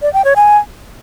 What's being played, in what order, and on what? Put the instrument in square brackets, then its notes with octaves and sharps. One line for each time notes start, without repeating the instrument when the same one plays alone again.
[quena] D5
G5
C#5
G#5